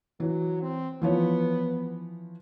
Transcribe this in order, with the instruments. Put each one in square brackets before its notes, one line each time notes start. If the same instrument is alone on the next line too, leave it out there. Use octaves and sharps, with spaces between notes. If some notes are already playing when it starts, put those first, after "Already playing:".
[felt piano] E3 [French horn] F#3
[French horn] C4
[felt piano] E3 F3 C#5 [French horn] B3